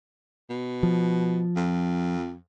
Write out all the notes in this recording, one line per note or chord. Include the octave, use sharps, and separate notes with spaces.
B2
F3
F2